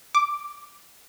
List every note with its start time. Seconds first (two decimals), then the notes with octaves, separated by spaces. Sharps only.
0.15 D6